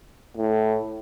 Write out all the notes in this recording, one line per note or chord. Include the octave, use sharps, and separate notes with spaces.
A2